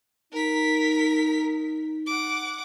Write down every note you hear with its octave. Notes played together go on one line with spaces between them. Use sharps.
D#4 A#4 B6
F#5 D6